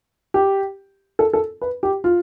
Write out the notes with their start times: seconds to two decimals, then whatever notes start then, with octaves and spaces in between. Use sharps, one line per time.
0.34 G4
1.19 A4
1.33 A4
1.61 B4
1.83 G4
2.04 F4